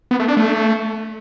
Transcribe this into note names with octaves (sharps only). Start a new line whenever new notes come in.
B3
A3
D4
A3